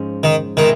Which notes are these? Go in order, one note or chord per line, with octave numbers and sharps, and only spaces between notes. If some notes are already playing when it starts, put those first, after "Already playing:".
Already playing: G#2 F3 G#3 C#4
D#3
B2 D#3 G#3 C4 E4